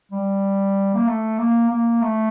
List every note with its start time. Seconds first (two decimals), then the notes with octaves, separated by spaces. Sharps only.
0.11 G3
0.94 A#3
1.07 A3
1.38 A#3
1.70 A#3
2.01 A3